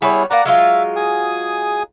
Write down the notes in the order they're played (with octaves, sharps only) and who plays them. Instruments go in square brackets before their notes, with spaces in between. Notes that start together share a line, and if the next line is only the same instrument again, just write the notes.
[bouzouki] G3 B3 C#5 [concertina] E4 G#4
[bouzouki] A#3 A#4 B4 [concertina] D5 F#5 A#5
[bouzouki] F#3 G#3 F4 [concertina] E5 F5
[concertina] G#4 G#5 D#6